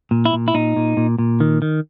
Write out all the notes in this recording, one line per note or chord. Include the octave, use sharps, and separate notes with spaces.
A#2
E4
A#2
E4
A#2 D#4
A#2
A#2
A#2
D#3
D#3